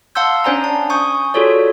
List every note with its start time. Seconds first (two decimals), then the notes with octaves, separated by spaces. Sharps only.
0.15 F5 F#5 A5 C6 E6 G6
0.44 C#4 D4 C5 D5 G#5 A#5
0.64 A5
0.90 G#5 C#6 D#6 G6
1.34 F4 F#4 G#4 A4 C#5 D5